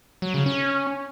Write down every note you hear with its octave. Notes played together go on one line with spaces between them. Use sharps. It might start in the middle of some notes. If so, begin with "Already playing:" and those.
F#3
C#3
C#4